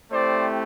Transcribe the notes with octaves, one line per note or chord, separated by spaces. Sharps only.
A3 C4 E4 G4 C5 D5